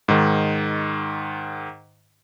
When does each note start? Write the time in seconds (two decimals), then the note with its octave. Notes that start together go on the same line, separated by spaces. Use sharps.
0.08 G#2 D#3